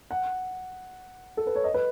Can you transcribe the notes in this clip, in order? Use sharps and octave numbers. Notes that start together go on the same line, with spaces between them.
F#5
A4
B4
C#5
D#5
B4